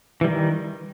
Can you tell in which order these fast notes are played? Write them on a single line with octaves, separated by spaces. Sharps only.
E3 G3 D#3